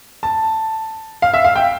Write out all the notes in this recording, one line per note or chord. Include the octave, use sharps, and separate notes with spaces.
A5
F5
E5
F5
G5